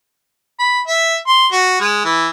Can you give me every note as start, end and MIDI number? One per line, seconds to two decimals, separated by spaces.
0.59 0.80 83
0.87 1.17 76
1.28 1.47 84
1.52 1.76 66
1.81 2.03 56
2.05 2.28 52